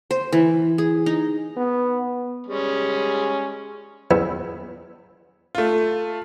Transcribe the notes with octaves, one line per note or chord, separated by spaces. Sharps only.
C5
E3
G#4
D#4
B3
G3 G#3 C#4
E2
A3 F4